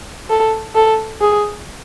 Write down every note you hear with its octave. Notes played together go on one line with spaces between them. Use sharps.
A4
A4
G#4